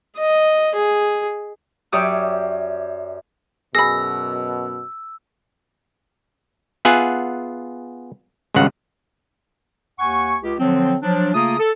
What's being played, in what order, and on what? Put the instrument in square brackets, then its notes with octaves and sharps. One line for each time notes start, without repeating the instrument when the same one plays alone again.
[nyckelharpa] D#5
G#4
[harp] F#2 G4 C#5 D5 E5 D#6
[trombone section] F#2 B2 [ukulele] G#4 B5 [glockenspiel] E6 [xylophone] A#6
[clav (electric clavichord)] B3 F4 G#4 E5 F#5 G#5
G#1 C#2 G2 C#3 F#5
[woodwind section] D#2 F#5 G#5 C#6
C#2 G4
D3 F3 F#3 C4
F3 F#3 D4
C#3 A3 A#3 F4 D#6
A4